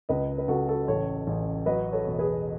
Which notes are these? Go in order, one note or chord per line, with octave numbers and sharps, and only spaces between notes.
C#2 B4 D#5
B4
C#2 F#4 A4
F#4 A4
A1 A4 C#5
A1
F#3 B4 D#5
A4 C#5
E1
G#4 B4